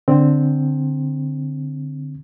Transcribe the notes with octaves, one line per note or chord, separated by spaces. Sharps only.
D3 C4